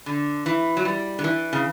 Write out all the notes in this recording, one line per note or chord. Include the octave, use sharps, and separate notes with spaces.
D3
E3
F#3
G3
D3
E3
C#3